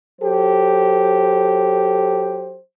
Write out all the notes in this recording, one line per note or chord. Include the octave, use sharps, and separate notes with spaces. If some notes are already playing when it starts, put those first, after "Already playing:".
F#3 G4 A4 C5